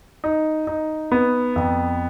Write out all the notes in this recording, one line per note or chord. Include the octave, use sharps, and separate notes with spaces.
D#4
D#4
B3
F2